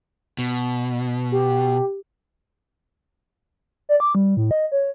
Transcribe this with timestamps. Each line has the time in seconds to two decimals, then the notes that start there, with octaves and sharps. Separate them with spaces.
0.39 B2
1.32 G4
3.89 D5
4.00 D6
4.15 G3
4.37 A2
4.51 D#5
4.72 C#5